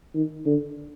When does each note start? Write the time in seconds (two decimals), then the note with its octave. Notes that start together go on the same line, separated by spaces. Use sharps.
0.14 D#3
0.45 D3